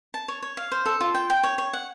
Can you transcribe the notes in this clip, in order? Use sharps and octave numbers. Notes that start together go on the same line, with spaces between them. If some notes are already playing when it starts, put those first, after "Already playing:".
A5
C#5
C#5
F5
C5
A4
F4
G5
G5
C#5
C#5
F#5